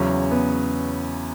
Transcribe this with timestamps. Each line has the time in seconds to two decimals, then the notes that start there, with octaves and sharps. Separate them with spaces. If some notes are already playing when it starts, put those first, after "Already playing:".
Already playing: E2 C#3 F#3 C#4
0.31 B3